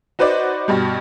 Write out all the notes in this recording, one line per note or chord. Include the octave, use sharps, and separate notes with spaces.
D#4 F#4 B4 C5 D5 D#5
G2 B2 G3